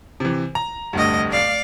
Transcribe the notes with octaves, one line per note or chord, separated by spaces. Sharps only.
C3 E3
A#5
F1 D2 G2 A3 D#5
D5 F5